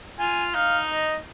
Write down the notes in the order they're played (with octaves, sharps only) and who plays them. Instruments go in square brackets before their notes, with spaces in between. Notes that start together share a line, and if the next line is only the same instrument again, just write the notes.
[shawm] F4 [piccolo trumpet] G#5
[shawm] D#4 [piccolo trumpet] F5
[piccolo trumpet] D#5